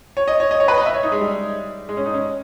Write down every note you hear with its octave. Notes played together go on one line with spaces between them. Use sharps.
C#5
D#5
C#5
D#5
C#5
B4
D#5
E5
C#5
D#4
G#3
G3
G#3
C#4
D#4
C#4